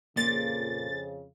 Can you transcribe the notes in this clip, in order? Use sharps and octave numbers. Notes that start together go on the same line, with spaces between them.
F2 A#2 C#3 A#3 A6